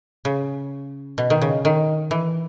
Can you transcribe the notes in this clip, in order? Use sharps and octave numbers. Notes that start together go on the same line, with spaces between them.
C#3
B2
D#3
C#3
D#3
E3